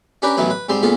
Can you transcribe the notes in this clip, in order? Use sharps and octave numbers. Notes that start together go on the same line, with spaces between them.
C#4 D4 G4 A#4 B4
A1 B2 D#3 E3 F#3 B4
B4
G#2 G3 C4 C6
A#2 C#3 B3 F4 A4